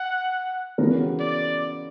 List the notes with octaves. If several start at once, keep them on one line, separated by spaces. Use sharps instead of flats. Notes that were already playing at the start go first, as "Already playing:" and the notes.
Already playing: F#5
C#3 E3 B3 F#4 A#4
D5